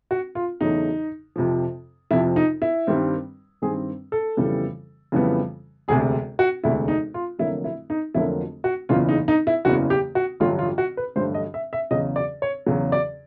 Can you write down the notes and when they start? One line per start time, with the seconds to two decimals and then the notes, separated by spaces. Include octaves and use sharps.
0.11 F#4
0.35 F4
0.60 E2 C#3 F#3 A3 D#4
1.36 F2 C3 F3
2.11 F2 C3 F3 E4
2.36 D#4
2.62 E4
2.87 G2 D#3 G3 C4
3.62 G2 D#3 G3 C4 G#4
4.12 A4
4.37 F2 C#3 E3 G3 B3
5.12 F2 C#3 E3 G3 B3
5.88 E1 D2 C3 G#4
6.39 F#4
6.63 E1 D2 C3 E4
6.88 D#4
7.14 F4
7.39 F1 F2 D3 F#3 A#3 E4
7.64 E4
7.90 D#4
8.14 F1 F2 D3 F#3 A#3 E4
8.64 F#4
8.89 F#1 E2 C#3 E3 F4
9.09 D#4
9.28 D#4
9.47 E4
9.65 F#1 E2 C#3 E3 F#4
9.90 G4
10.15 F#4
10.40 A1 G2 D3 F#3 A3 F4
10.59 F4
10.78 F#4
10.97 B4
11.16 A1 G2 D3 F#3 A3 C5
11.34 D#5
11.54 E5
11.73 E5
11.91 E2 C#3 F#3 D#5
12.16 D5
12.42 C#5
12.66 E2 C#3 F#3
12.92 D5